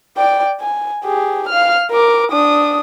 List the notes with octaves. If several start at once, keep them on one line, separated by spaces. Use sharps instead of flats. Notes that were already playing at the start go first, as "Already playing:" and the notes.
D5 G5
G#5
G4 G#4
F5 F6
A#4 D6
D4 D#6